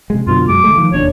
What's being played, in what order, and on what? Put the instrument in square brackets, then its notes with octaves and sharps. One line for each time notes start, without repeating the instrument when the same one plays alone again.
[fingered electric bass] C3 G#3
[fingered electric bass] F#2 B2 D3 [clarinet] F4
[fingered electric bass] F#2 F#3 G#3 [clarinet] D6
[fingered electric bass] D3 G#3 A3
D#3 F3
[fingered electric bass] E1 D#2 D4 [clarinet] C#5